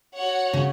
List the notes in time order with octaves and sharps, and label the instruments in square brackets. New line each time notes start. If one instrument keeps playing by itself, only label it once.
[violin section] F#4 C#5 F#5
[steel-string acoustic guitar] C#3